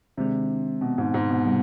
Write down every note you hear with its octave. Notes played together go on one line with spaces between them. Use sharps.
C3 D#3 G#3 D4
B2
G#2
G#2
B2
C3 G3 B3